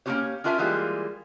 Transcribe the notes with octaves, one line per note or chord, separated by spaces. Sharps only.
A#3 C#4 D#4 F4 G4 C#5
C#4 D4 F4 A#4 E5 G#5
E3 G3 G#3 A#3 F4 G#4